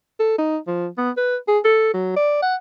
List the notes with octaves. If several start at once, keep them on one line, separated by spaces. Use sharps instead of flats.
A4
D#4
F3
B3
B4
G#4
A4
F#3
D5
F#5